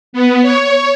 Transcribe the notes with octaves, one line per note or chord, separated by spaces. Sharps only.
B3
C#5